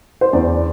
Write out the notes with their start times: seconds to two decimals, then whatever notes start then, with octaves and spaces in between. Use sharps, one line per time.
0.21 C5
0.33 E2 D5